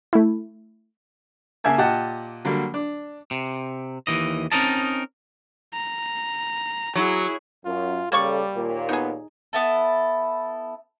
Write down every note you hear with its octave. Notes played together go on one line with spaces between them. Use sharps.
A3 E4
C#3 A#3 E5 G#5 A5
A#2 G4 D#5 F#5 A5
D3 F#3 G3 A#3
D4
C3
D#2 E3 D#5
C4 C#4 D#4 A#4 D#5 A5
A#5
F#3 E4 G#4
F#2 F4
C#3 G3 A#3 A4 D5 C#6
D#2 A#2
B3 D#4 G#4
B3 E4 A4